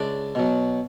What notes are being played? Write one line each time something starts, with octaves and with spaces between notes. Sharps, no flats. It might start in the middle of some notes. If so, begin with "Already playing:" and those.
Already playing: C#2 D4 D5
B2 F#3